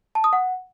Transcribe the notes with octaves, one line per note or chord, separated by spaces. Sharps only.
A5
D#6
F#5